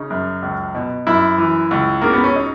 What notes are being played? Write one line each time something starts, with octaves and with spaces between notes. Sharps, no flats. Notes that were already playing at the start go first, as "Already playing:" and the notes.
Already playing: C#3 D#4
F#2
C#2
B2
F#2 E4
E3
C#2
C#3 A#3
B3
C#4
D#4